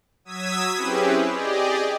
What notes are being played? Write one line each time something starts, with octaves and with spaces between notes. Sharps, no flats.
F#3 D#6 E6 G#6 B6
C4 C#4 E4 G4 G#4 B4
G4 G#4 D5 D#5